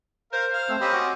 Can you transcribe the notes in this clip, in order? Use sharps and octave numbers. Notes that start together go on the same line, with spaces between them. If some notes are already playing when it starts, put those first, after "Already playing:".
A#4 C5 F5
F5 F6
A3 C4 E6
C4 C#4 G4 D#5 B5 E6
F#4 D6